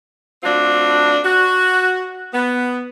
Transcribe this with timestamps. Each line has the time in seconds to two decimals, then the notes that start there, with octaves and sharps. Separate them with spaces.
0.43 A3 C4 D4 F4 F#4
1.24 F#4
2.34 B3